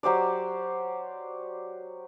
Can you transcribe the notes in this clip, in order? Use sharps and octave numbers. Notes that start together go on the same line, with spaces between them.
F#3 G4 C5 D5